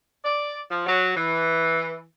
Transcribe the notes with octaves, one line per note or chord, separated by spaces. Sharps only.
D5
F3
F#3
E3